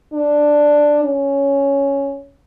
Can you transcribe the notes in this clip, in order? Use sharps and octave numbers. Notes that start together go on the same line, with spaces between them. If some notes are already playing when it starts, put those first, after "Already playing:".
D4
C#4